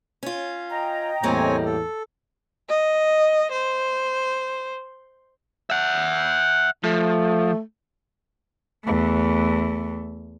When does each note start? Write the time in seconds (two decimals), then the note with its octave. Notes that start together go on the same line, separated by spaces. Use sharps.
0.23 C#4 F4
0.69 D#5 G5 A#5
1.23 E2 A2 G3 A#3 C4 C#5 G#5
1.65 A4
2.69 D#5
3.52 C5
5.70 E5 F#5
6.84 F3 A3
8.84 E2 A3